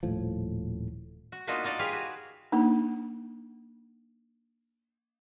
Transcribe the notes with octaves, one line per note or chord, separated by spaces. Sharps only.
D#1 A2 F3
F#4
A#3 B3 D4 D#4 F4 F#4
A#3 D#4 D5 A5
F4 G4 G#4 B4 F5
F#4
A#3 D4 D#4